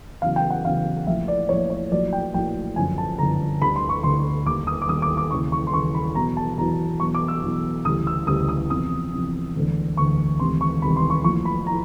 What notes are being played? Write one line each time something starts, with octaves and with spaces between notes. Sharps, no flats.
E2 C#3 F#3 F5
G5
F#5
E2 C#3 F#3 F5
A#1 A2 F3 E5
D5
A#1 A2 F3 C#5
C#5
A#1 A2 F#3 D5
G5
A#1 A2 F#3 G5
G1 F#2 D3 F3 G#5
A5
G1 F#2 D3 F3 A#5
D2 D3 G3 B5
C6
C#6
D2 D3 G3 C6
D#2 D#3 G3 D6
D#6
D6
D#2 D#3 G3 D#6
D6
D6
D#2 C#3 E3 C#6
C#6
C6
D#2 C#3 E3 C#6
B5
E2 B2 F#3 A#5
A5
E2 B2 F#3 A#5
E2 B2 F#3 C#6
D6
E6
E2 B2 F#3
D2 C#3 E3 G3 D#6
E6
D2 C#3 E3 G3 D#6
D#6
E2 C3 F3 D#6
E2 C3 F3
E1 D2 D3
E1 D2 D3 C#6
E1 D2 C3 D#3 G3 C6
C#6
E1 D2 C3 D#3 G3 B5
C6
C#6
A#1 A2 F3 C#6
B5
A2 F3 A#5